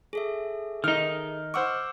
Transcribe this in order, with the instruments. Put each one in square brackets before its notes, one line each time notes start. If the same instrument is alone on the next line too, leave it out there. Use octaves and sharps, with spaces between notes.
[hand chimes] G#4 A4 E5
[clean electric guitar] D#3 D#4 [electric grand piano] F6
[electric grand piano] C5 F#5 C#6 [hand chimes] D6 E6 F6